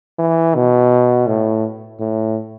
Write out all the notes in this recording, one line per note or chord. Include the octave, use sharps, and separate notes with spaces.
E3
B2
A2
A2